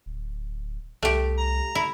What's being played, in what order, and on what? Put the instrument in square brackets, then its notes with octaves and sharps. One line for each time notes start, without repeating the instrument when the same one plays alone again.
[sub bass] D1
[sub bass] C2 [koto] A3 G4
[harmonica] A#5
[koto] E4